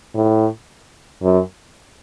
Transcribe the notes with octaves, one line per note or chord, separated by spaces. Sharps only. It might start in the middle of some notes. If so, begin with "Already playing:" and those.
A2
F#2